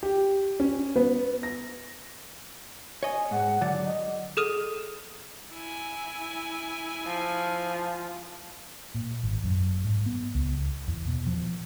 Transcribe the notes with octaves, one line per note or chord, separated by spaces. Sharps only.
G4
C#4
B3
A#6
C#5 D#5 G#5
G#2 F#5
D3 F#3 D5
D#5
G#4 A4 D#6 F6 D#7
E4 G#5
F3
A#2
G#1
F#2
G#2
B3
C#2
E2
B2
F3